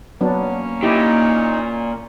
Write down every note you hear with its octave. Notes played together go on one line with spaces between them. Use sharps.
F#3 A#3 B3 C#4 D4
A#2 D#4 E4 G4